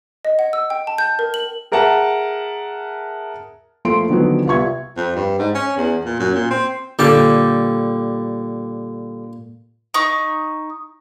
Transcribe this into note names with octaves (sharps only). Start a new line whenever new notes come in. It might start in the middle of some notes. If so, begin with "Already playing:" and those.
D#5
F#5
E6
G5
A5
G6
A#4
F#7
G#4 A#4 E5 F#5 A5 A#5
F3 A3 A#3 F4 C6 D7
D3 D#3 F3 F#3 B3 F#4
C2 B3 F4 E5 C#6 G#6
F2
G2
G#2
C#4
E2
A#2
F#2
A#2
C4
A#2 D3 G3 A4 D6
D#4 C#6